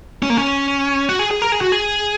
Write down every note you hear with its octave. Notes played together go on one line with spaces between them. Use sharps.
C#4
A#3
C#4
F#4
G#4
G#4
A#4
G#4
F#4
G#4